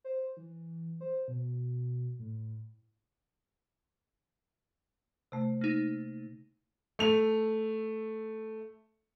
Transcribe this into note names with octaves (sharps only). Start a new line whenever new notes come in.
C5
E3
C5
B2
A2
C3 A3
A#3 D#4
A3 F7